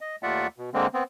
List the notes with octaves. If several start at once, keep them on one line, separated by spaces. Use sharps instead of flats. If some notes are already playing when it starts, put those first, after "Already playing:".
D#5
D#2 A3 F4 D5 E5 F#5
B2
D3 G#3 A#3 C4
B3 C4